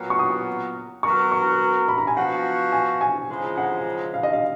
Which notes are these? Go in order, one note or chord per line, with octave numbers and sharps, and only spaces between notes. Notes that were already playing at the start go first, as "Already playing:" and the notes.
Already playing: A#2 F#3 B3 F#4 A#4
C#6
D#6
F#3 B3 F#4 A#4 C#6
C#6
B5
A#5
G#5
F3 B3 F#4 F#5
G#5
G#5
C#3 F3 G#3 D#4 G#4
F#5
F5
D#5
F5